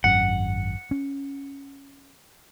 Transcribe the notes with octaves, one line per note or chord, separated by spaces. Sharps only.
G#1 F#2 F#5
C#4